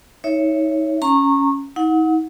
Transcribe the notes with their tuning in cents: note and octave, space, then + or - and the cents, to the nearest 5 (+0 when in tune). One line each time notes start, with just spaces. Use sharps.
D#4 +30 C#5 +0 E5 +0
C#4 +0 A#5 -20 C#6 -20
D#4 +45 F#5 -15